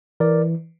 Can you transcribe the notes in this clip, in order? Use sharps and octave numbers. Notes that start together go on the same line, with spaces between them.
E3 A#4 D5